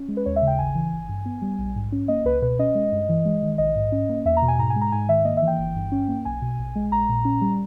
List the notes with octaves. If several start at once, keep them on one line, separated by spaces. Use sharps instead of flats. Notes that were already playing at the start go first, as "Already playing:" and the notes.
Already playing: C#4
G#3
B4
D#2 C#5
E5
C#3
G5
G#1 G#5
E3
G#1
G2
B3
G3
A#1
G#2
C#4
A#3 D#5
C#2 B4
B2 B4
C#4 D#5
G#3
G2
E3
G#3
D#3
A#1 D#5
G#2
C#4
A#3
E2 E5
A#5
B2
G#5
G#2 A#5
G#5
G#3
A#5
G#2 G#5
D#3 E5
A#3 D#5
E5
E3
G5
G1
G2
C#4
A#3
B1 G#5
B2
A#1
G#3
A#1 A#5
A#2
C#4
G3